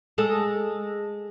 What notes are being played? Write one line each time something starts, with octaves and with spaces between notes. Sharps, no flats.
G#3 A4